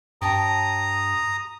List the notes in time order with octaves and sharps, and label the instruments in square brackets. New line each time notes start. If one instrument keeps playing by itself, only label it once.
[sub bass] G2 [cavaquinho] G4 C#5 A5 [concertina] A#5 D#6